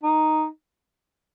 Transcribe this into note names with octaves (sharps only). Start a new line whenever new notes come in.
D#4